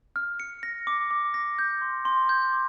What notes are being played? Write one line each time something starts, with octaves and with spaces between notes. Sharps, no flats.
F6
C#7
A#6
D6
D6
A#6
G6
C6
C6
G6
D6